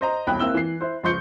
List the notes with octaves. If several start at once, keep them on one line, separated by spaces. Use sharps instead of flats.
C5 D#5 A#5
E1 C2 G5 B5 F#6
A#3 C4 E4 E6 G7
E3 C7
E4 C5
C#2 F3 C6 C#6 G6 C#7